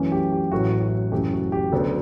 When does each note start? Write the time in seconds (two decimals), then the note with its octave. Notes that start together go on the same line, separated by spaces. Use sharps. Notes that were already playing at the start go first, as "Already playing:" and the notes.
Already playing: F#2 E3 A3 C#4
0.12 G4
0.32 G4
0.52 A1 A2 F#3 A3 F#4
0.82 F#4
1.12 F#1 F#2 E3 A3 G4
1.33 F#4
1.52 G4
1.72 D2 C#3 F#3 B3 D4 A4